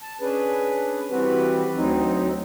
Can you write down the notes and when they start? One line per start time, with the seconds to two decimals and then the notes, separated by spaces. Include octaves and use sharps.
0.01 A5
0.21 C#4 D4 G#4 B4
1.11 E3 G3 C4 F#4 G4 B4
1.76 D2 F#3 C4 D#4